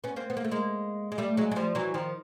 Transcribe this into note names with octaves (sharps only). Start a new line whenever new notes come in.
B3 C#4
A#3 C4
B3
A#3
A3
G#3 A#3
G#3
G3 A3
F#3 G#3
G#3
F3 G3
E3 F#3
D#3 F3